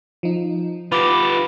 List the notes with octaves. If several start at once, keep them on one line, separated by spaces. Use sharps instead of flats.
F3 D#4
F4 G4 B4 B5 D6